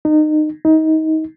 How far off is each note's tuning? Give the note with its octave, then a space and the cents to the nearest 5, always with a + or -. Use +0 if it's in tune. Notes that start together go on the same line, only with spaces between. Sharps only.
D#4 -25
D#4 +25